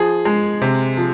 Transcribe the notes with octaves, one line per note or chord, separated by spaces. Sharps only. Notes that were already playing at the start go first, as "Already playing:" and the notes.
Already playing: F3 G#4
G#3
C3
F3